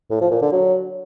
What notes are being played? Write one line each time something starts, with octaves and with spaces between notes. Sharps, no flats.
A2
F3
A#2
D3
F#3